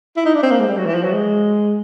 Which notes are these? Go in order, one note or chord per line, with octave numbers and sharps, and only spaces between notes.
E4
D#4
D4
C4
A#3
G#3
G3
F#3
E3
F3
F#3
G#3